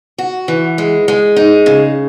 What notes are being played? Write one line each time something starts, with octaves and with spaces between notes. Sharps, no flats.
F#4
E3
G#3
G#3
D#4
C#3